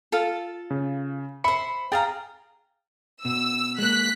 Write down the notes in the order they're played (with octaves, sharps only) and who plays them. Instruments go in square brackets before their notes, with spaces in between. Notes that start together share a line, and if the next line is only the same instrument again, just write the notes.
[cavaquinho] F4 A4
[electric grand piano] C#3
[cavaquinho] C5 E5 [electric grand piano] B5 C#7
[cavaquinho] G#4 F5 A#5 [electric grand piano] G5 A6
[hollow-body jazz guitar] B2 [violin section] E6
[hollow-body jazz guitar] G#3 A#3 [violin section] F#6 B6